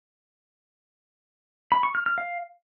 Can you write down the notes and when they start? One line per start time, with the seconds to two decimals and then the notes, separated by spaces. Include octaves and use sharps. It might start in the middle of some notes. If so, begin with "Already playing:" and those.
1.72 B5
1.83 C#6
1.95 F6
2.06 F6
2.18 F5